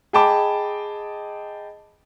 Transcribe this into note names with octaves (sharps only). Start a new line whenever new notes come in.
G#4 D#5 G5 A5 B5 D6